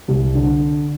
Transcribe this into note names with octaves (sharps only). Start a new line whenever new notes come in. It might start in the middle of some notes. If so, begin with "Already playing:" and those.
C2
D3